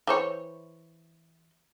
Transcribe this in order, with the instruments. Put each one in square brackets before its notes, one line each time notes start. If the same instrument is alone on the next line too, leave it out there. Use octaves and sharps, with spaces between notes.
[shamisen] E3 C5 C#5